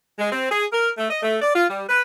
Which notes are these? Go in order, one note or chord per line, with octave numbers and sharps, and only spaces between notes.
G#3
C4
G#4
A#4
A3
D#5
A3
D5
F4
G3
B4